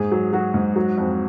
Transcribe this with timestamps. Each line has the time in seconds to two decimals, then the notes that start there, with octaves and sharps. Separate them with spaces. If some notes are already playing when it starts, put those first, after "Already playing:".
Already playing: G#2 G#4
0.12 F#3
0.33 F#3 F#4
0.54 G#2
0.76 F#3
0.98 F2